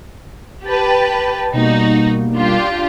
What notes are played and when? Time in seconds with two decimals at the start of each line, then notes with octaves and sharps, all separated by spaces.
0.63 G4 B4 G5 A5 A6
1.53 B2 G3 A#3 D#4 F#4
2.35 D4 F4 G4